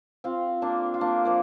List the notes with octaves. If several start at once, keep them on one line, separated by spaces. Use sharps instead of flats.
C4 F4
A#3 D4
F4
A#3 D4
F3 A#3